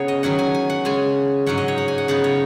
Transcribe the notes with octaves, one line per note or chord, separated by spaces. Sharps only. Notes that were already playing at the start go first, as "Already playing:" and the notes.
Already playing: C#3 B3 D#4 F#4 G#4 C#5
D#5
D#3 F#3 C#4 F#5
G#5
G#5
F#5
C#3 G#3 C#4 G#5
G#2 F#3 C#4 F#5
D#5
C#5
F#5
G#5
F#5
C#3 B3 D#4 F#5
C#5